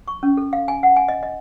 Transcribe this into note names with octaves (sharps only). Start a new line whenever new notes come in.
C#6
C#4
A4
F5
G#5
F#5
G#5
D#5
D#5